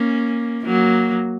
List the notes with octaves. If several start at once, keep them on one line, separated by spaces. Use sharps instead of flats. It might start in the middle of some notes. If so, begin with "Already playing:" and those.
Already playing: A#3 C#4
F#3 A#3